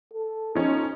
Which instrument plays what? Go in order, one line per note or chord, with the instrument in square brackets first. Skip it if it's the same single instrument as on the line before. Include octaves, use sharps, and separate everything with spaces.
[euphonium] A4
[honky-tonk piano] F3 C#4 [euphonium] D#4